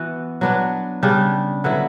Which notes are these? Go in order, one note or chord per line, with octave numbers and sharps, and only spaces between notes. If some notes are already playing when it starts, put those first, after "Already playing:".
Already playing: E3 B3 F#4
F#3 B3 D4
C#3 G3 D4
D3 F#3 B3 E4